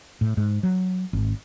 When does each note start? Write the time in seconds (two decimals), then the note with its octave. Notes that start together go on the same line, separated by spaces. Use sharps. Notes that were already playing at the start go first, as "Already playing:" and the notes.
0.21 A2
0.37 G#2
0.63 F#3
1.13 G#1